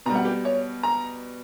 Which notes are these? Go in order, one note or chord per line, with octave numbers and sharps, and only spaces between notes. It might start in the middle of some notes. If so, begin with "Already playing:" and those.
B2 G3 A#5
F#5
G4
C#5
A#5